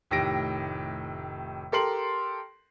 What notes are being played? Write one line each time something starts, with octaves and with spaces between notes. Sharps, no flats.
F1 A2 D#3 G4 A#6 D7
G4 A4 A#4 C6 C7 F#7